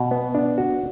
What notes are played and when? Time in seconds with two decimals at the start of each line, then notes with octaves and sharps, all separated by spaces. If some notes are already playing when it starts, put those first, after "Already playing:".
Already playing: B2
0.11 B3
0.35 D4
0.58 F#4